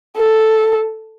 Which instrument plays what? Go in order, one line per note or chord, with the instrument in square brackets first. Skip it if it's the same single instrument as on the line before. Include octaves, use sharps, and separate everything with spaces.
[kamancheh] A4